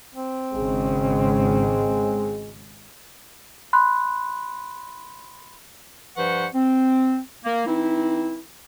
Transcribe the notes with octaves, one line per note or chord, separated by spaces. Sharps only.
C4
G#1 C#3 G#3 C#4
B5 C6 F#6
G2 F3 B4 C5 F#5 C#6
C4
A#3
E3 C4 D#4 E4